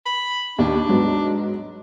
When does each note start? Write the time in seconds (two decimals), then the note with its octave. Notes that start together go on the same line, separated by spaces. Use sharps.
0.06 B5
0.58 D#2 D4
0.89 G#2 F#3 B3